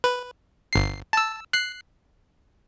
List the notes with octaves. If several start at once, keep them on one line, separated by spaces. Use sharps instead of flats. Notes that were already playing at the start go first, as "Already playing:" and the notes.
B4
G1 C7
A5 E6
F#6 C7